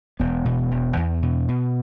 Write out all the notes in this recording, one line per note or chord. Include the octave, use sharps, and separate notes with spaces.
E1 B3
B2
E1
E2
B2
B2